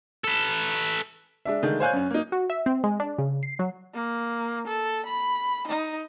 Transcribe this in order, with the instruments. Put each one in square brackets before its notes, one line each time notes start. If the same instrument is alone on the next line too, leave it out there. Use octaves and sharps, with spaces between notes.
[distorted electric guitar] A4 B4
[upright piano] G#3 D4 E5
D3 D#3 G#3 A3
C5 C#5 F5 G#5 F#6 G6
F#2 C#4
A#3 D#4
[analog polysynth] F#4
E5
C4
G#3
D4
C#3
C7
F#3
[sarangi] A#3
A4
B5
D#4